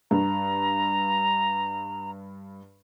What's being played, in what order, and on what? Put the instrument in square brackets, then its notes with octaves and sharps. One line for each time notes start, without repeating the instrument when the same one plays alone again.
[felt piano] G2 [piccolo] A#5